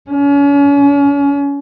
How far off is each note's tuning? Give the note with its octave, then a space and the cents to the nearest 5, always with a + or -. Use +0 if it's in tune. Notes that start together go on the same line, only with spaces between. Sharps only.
C#4 +35